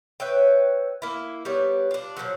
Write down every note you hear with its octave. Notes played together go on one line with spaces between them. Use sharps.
B4 C#5 E5 G5
A#3 E4
G3 B3 C#5 D5
D4 F4
A#2 D#3 F3 F#3